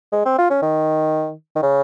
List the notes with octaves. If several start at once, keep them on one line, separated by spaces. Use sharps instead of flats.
G#3
C4
F4
C#4
D#3
D#3
C#3